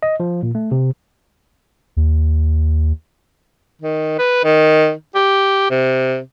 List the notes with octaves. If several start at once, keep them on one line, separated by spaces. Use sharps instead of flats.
D#5
F3
A#2
A3
C3
D#2
D#3
B4
D#3
G4
C3